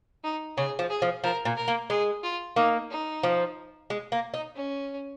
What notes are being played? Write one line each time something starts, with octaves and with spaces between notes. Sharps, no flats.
D#4
C#3 G#4
F3
G#4
F3
F3 A#4
A#2
A#4
A#3
G#3 G#4
F4
A#3 D#4
D#4
F3
G#3
A#3
D#4
C#4